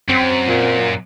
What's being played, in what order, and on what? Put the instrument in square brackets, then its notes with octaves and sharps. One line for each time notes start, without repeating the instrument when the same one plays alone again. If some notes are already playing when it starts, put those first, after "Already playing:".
[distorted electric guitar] F#2 [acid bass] C4
[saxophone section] A#2